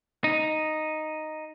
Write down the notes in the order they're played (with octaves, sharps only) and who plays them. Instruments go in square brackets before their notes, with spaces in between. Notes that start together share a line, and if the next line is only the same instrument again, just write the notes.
[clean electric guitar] D#4